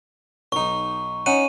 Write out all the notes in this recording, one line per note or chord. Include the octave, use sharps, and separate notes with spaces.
B1 D#4 C#6
C#4 D#4 F#5 D#7